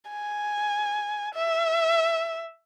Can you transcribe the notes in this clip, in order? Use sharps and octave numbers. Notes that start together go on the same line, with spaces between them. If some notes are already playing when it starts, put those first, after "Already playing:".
G#5
E5